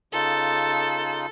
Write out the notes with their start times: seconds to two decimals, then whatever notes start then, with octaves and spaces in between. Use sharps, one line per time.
0.13 C#3 D#4 F4 A4